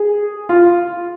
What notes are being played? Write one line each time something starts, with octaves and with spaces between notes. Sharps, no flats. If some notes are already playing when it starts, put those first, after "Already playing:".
Already playing: G#4
F4